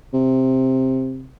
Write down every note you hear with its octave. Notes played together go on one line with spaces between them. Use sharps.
C3